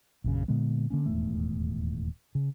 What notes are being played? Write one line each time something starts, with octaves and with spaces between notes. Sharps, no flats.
A#1 F#2 C#3
A#2 D3 G#3 B3
D3 A#3 C#4
D#1 E2 G#2 A3
C#3